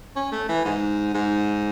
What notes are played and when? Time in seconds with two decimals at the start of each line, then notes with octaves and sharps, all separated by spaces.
0.16 C#4
0.32 A3
0.49 E3
0.65 G#2
1.14 G#2